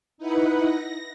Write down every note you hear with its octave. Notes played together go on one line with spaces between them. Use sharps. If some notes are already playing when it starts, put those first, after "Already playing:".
D#4 E4 B4 F#5
A#6